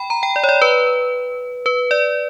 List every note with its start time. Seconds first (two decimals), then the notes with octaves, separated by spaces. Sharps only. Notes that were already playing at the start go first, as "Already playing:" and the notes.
Already playing: G5 B5
0.10 A#5
0.23 G5
0.36 D5
0.44 C#5
0.49 D5
0.62 B4
1.66 B4
1.91 D5